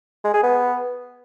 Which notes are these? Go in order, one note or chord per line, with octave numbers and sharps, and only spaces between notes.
G#3
G#4
B3